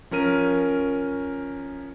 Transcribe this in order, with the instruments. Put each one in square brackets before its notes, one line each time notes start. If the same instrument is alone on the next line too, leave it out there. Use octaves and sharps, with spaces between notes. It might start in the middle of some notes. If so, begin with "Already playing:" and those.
[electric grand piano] F3 C#4 A#4 D#7